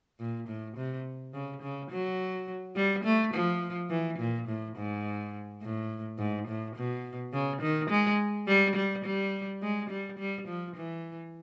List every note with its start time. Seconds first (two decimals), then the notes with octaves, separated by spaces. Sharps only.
0.19 A#2
0.48 A2
0.77 C3
1.34 C#3
1.62 C#3
1.90 F#3
2.76 G3
3.04 A3
3.34 F3
3.90 E3
4.19 A#2
4.48 A2
4.76 G#2
5.62 A2
6.18 G#2
6.48 A2
6.76 B2
7.33 C#3
7.62 D#3
7.90 G#3
8.47 G3
8.76 G3
9.05 G3
9.62 G#3
9.90 G3
10.19 G3
10.48 F3
10.76 E3